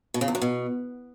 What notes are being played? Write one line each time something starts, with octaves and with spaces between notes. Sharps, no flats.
B2
C#3
E2
F#2
B2